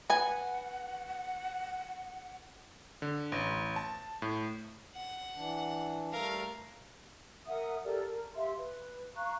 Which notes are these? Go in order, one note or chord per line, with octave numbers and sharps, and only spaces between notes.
B4 F#5 G#5
D3
A1
A5
A2
F#5
E3 D4
G3 A3 A4 A#4 F5
A#4 E5 F#5 D#6
G4 A4 A#4 D5
A#4
G4 E5 F5 C6
B4
F5 A#5 C#6 F#6